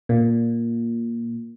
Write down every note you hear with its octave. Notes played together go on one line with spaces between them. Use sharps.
A#2